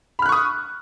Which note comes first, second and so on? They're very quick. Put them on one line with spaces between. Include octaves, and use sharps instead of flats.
B5 F6 F#6 C#6 D#6